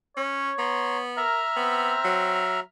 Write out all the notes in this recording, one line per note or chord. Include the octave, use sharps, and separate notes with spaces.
C#4 C#5
B3 A#5 C6
A#4 E5 A#5 F6
B3 C4
F#3